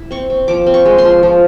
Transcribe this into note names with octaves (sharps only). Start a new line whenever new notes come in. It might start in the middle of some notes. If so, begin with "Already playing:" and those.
Already playing: E4
C4 C#6
C4
F3 D6
C4
C#6
G#3
C6
F3
F3